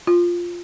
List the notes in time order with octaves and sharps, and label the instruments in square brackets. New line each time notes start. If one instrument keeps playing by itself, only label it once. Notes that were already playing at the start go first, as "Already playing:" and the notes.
[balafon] F4